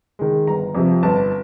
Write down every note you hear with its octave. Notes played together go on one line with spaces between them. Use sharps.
D#3 G#3
G1 A#5
F2 C3 F3
G1 A5